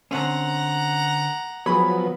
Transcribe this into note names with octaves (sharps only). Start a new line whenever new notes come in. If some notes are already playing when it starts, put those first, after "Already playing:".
D3 C4 C#4 F#5 A#5
F3 F#3 B3 G#4 B4 C#5 B5